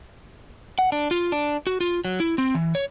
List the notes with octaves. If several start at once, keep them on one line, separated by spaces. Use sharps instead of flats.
F#5
D4
F4
D4
F#4
F4
F#3
E4
C4
E3
C#5